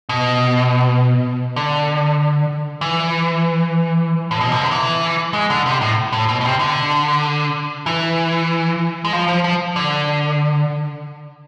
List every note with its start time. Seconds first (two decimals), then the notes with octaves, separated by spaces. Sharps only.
0.09 B2
1.56 D3
2.81 E3
4.31 A2
4.41 B2
4.52 C3
4.61 D3
4.71 E3
5.34 G#3
5.50 D3
5.66 C3
5.81 A2
6.13 A2
6.29 B2
6.41 B2
6.45 C3
6.60 D3
7.86 E3
9.05 G#3
9.13 F3
9.28 F3
9.44 F3
9.76 D3